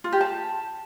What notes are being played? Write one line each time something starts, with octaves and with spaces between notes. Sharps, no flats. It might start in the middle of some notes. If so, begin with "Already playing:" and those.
F4
G4
A5